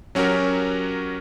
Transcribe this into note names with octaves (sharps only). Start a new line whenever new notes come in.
F#3 C#4 F#4 G4 A#4